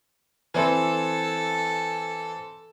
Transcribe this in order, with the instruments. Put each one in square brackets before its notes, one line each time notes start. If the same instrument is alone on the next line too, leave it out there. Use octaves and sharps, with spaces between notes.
[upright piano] E3 C4 [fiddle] A4